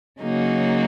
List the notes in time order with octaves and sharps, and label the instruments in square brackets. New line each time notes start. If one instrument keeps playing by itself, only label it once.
[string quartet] C#3 F#3 A#3 D#4 F#4